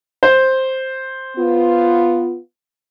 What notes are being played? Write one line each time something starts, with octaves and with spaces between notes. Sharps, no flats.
C5
B3 F4